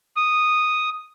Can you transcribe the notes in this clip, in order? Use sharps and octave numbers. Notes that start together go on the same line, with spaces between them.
D#6